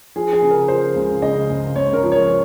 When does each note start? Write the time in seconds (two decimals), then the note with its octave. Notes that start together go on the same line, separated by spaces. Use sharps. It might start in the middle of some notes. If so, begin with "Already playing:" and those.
0.16 F3 G#4
0.33 G#4
0.42 C#3
0.50 A#4
0.68 F3 C5
0.96 C#2
1.22 C#3 D#5
1.50 C#2
1.76 C#2 C#5
1.93 A#4
2.03 F3
2.12 C#5